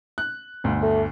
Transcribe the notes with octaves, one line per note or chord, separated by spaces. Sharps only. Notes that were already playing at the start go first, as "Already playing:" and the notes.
F#6
G1 D2
A3